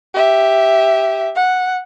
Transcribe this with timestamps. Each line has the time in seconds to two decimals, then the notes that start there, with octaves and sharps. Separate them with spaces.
0.14 G4 E5
1.35 F#5